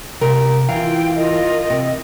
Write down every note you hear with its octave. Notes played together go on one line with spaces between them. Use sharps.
C3 G4 A#4
E3 F4 F5 G5
F4 A#4 D#5
C3